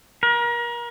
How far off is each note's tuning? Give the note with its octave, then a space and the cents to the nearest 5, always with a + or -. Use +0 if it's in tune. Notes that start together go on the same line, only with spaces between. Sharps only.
A#4 +35